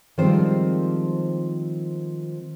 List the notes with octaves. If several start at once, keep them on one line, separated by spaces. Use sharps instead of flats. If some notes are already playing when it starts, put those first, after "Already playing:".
D#3 F3 G3 G#3 C4 C5